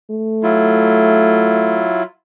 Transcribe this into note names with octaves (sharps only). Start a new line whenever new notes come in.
A3
F#3 E4 F4